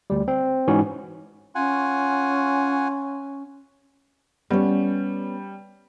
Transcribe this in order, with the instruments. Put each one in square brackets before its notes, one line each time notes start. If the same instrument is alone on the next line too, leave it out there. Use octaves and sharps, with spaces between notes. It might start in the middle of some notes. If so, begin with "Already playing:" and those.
[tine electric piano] D2 G3
C4
G#2 E3 C#4 D#4 F#4
[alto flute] C#4 [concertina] F4 F#5 G#5
[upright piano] G3 [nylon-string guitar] B3 C#4